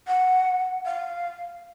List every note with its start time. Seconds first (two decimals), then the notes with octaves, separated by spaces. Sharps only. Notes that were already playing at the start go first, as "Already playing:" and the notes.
0.07 F#5
0.86 F5